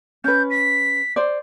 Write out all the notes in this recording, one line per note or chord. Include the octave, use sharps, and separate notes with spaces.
C#4 B4 G6
B6
C5 D5